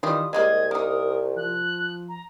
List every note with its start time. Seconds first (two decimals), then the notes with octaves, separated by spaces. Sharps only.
0.03 D#3 E3 G3 F4 D#6
0.33 C2 G3 G#3 A#3 D#5 G#6
0.71 A#3 D#4 A#4 D#6
1.37 F3 F#6
2.08 A#5